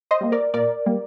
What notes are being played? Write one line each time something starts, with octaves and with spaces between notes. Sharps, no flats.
C5 D#5
G3 A#3
A#4 D5
A#2 A#4 D5
G3 A#3